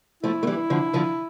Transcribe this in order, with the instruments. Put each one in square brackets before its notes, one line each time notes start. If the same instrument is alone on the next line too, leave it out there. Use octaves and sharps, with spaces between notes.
[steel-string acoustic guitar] F3 A3 [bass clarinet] E4
[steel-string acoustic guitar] A3
E3 G3
D3 F3
D3 F3